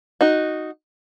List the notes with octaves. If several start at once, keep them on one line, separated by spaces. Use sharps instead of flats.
D#4 F#4